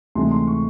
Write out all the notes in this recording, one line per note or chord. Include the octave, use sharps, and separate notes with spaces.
D2 C3 E3 G#3 C6
C6
C#6